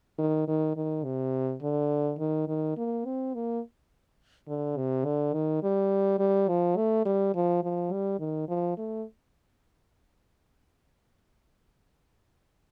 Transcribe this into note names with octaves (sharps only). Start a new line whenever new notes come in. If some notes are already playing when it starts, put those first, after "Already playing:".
D#3
D#3
D#3
C3
D3
D#3
D#3
A#3
C4
A#3
D3
C3
D3
D#3
G3
G3
F3
A3
G3
F3
F3
G3
D#3
F3
A3